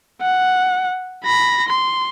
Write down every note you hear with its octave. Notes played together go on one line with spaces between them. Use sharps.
F#5
B5 A#6
C6